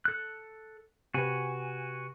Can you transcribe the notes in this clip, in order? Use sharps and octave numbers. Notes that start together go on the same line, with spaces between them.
A4 F#6
C3 F#4 G4 B4 G#5